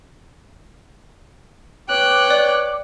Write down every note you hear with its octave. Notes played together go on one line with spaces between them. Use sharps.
B4 C#5 G5 D6 F#6
D5